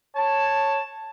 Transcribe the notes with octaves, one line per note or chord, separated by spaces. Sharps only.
C#5 A5